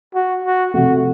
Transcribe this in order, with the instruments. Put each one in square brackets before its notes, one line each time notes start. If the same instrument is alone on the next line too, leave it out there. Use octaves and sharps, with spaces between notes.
[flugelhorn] F#4
F#4
[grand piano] C3 F3 A3 [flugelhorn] F#4